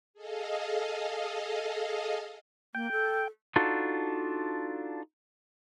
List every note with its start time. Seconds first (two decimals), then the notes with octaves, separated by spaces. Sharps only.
0.14 G#4 A4 D#5 F5
2.75 A#3 G5
2.92 A4
3.56 D4 D#4 F4 F#4 A4